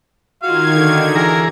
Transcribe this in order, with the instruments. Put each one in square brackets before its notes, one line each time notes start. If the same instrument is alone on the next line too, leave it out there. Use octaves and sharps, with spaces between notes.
[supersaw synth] D#3 G#6 [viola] F4 F#4 [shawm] F5
[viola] D3 F#4
[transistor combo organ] E3 G#4 A#5 [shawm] A#4